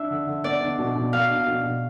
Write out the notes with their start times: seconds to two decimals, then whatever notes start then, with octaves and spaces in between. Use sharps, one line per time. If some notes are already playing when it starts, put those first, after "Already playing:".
Already playing: D4 E5
0.10 D3
0.27 D3
0.44 B3 D5
0.62 D4
0.79 B2
0.95 B2
1.13 B3 F5
1.30 D4
1.47 B2
1.64 B2